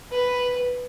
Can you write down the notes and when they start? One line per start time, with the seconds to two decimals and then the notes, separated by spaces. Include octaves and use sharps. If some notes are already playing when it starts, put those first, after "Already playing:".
0.12 B4